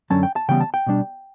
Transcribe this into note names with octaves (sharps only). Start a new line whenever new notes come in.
F#2 D3 F#3 C#4 A5
G5
A5
C#3 E3 G3 B3 G5
A5
G5
B2 G3 D4